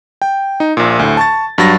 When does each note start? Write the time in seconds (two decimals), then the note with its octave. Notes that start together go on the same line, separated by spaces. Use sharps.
0.22 G5
0.60 D#4
0.77 A#1 A#2
0.99 D2 A2
1.17 A5 C#6 A6
1.58 G2 F#3 A6 A#6